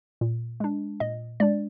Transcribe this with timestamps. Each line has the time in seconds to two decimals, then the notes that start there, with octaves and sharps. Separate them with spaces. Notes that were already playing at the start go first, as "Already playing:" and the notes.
0.21 A#2
0.60 G#3 D4
1.00 A#2 D#5
1.40 G#3 D4 D5